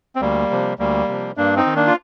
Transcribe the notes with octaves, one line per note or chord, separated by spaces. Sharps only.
C4
D2 G3 A#3
C3 F3
D2 G3 A#3
C3 F3
G2 A#3 D4
C4 D#4
D#3
A#3 D4
F4